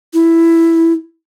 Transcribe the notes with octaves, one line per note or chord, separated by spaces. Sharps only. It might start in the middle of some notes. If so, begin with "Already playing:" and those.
E4